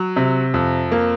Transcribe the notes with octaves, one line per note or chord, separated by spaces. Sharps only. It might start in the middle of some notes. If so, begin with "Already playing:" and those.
Already playing: F#3
C3
F2
A#3